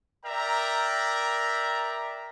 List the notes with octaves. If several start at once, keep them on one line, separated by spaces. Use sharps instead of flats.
A#4 D5 E5 G5 A#5